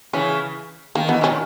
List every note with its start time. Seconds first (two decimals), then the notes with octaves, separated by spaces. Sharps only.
0.13 C#3 E3 C#4
0.95 D#3 A#3
1.08 E3 B3
1.21 B2 D#3 C#4
1.29 A#2